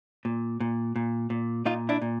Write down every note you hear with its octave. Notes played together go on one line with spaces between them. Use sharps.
A#2
A#2
A#2
A#2
A#2 D#4 F4
D4 E4
A#2